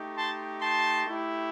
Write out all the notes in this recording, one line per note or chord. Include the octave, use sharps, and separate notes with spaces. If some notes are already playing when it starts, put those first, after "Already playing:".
Already playing: A3 D#4 G4
A5 C6
A5 C6
A3 E4 G4